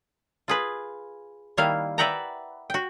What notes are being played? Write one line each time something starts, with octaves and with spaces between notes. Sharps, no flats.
F4 G#4 B4
D#3 G3 A#3 E4 F5
B4 D5 E5 F#5 G5 A#5
F#4 G5